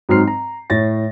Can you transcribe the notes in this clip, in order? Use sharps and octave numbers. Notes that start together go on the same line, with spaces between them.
G#2 F#3 C4 A#5 F6 C7
A#5
A2 C#5 A6 A#6